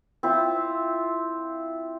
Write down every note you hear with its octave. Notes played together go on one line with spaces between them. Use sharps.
C4 E4 F4 E5